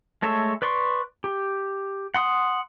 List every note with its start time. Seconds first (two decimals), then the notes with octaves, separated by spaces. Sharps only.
0.22 G#3 A3 A4 C#5 E5
0.62 B4 D5 C6 C#6
1.24 G4
2.14 F#5 C6 D#6